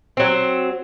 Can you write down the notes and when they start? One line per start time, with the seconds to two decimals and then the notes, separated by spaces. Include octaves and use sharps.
0.17 F#3 C4